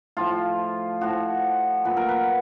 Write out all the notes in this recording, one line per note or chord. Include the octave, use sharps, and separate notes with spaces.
A2 F3 F4
A2 F3 F#4
A#2 F#3 B4
A#4
B4